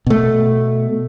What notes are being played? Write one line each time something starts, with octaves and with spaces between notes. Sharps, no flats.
B2 A3